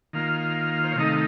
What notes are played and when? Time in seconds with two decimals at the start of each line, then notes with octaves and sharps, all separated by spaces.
0.13 D#3 A#3 F4 F5
0.84 C5
0.92 C#5
0.95 C3 D#3 A3 D#4 D#5
1.08 F5